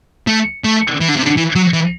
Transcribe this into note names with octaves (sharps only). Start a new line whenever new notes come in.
A3
A3
E3
D3
C3
D3
E3
F#3
E3